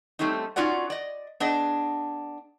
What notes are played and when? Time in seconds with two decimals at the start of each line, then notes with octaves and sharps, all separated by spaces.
0.19 G3 A3 C4 C#4 D#4
0.56 C#4 D#4 F4 F#4 D5 F#5
0.90 D5 D#5
1.40 B3 D4 G#4 D#5